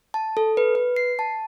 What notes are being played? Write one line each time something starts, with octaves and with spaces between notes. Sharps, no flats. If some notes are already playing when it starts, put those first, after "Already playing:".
A5
A4
B4
B4
C7
A5